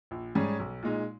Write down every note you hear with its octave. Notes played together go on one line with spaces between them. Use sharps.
A#1
G#2 G3 C#4 G#4
B1
A#2 G#3 D#4